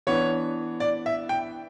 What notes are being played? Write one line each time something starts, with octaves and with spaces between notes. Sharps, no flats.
E3 B3 D4 C#5
D5
E5
G5